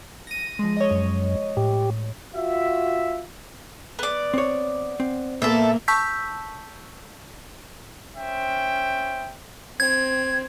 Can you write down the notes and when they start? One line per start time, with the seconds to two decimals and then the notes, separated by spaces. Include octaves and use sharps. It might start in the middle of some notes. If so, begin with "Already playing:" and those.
0.27 A#6 D#7
0.59 F3 G#3
0.77 C#5 D#5
0.91 F#2
1.57 A2 G4
2.35 F4 F#4 E5
3.99 B3 D5
4.34 C4 C#5
5.00 C4
5.42 A#2 A#3 B3 A4 E5
5.88 A5 C#6 E6 G6 B6
8.16 C#4 C5 E5 G5
9.80 C4 G#6